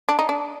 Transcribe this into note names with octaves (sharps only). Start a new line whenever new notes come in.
D4
D#4
D4